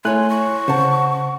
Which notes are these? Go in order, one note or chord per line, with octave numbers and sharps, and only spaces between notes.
A3 E4 C#5 G#5 C6 F#6
C#6
C#3 C5 F#5 A5